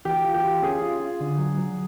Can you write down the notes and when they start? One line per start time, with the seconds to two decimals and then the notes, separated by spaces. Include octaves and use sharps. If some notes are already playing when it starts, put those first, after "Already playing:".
0.05 E3 G4
0.24 F4
0.34 G4
0.44 F4
0.62 C#4 G#4
0.82 F4
1.00 F4
1.20 D3
1.38 F#3
1.57 F#3